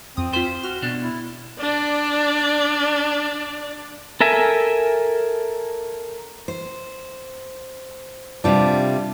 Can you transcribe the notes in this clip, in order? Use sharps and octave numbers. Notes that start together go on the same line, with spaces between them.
F2 C4 D#6
F4 C5 B6
F#4 F6
B2 D4
E4
D4 D5
A4 A#4 E5 G#5
C5
C3 G3 D4 F4